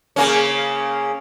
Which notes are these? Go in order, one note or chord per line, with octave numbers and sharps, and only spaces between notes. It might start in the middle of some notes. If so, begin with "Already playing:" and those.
C#3 A#3 C#4